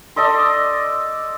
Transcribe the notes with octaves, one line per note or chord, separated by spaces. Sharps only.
A4 D5 D#5 C6